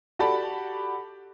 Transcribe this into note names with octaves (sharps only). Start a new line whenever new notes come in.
F#4 G4 A4 D5 A5 B5